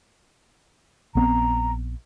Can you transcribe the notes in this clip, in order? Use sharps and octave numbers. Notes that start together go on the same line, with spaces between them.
A#1 B3 C4 A#5